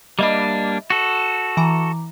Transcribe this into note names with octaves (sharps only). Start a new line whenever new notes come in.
G3 A#3 D4 D#5 E5 B5
F#4 A4
E3 A#5 D6